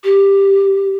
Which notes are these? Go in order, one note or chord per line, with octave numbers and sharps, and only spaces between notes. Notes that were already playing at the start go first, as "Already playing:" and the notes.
G4